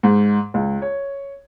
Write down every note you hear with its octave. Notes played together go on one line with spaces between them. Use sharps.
G#2
C#2
C#5